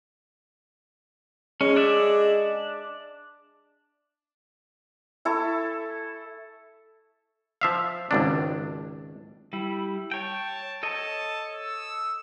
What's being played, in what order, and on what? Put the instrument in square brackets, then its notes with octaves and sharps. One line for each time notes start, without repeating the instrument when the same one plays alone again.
[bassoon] G#3 [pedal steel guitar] C#4
[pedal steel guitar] D4 D5 E5
[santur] E4 A4 C#6
[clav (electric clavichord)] F3 E5 F5
G#1 C#2 D4
[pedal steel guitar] G3 E4
[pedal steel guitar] C#5 G5 [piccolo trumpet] A5
[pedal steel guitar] A4 C#5 D#5 [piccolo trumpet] A5
[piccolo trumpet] E6